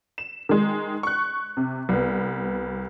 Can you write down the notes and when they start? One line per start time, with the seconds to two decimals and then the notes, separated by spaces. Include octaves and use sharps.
0.18 E7
0.49 D#3 G#3
1.03 C#6 F#6
1.57 C3
1.89 C2 B3